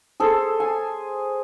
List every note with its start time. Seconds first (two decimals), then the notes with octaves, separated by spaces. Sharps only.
0.20 G#4 A4 C5
0.60 G#5